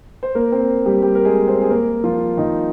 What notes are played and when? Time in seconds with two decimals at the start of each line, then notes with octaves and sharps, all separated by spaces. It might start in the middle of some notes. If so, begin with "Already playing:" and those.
0.23 C5
0.35 A#3 A#4
0.52 C4 C5
0.85 G3 G4
1.02 G3 G4
1.15 A#4
1.25 G#3 G#4
1.47 C4 C5
1.62 G#4
1.70 A#3 A#4
2.04 F3 F4
2.37 D#3 D#4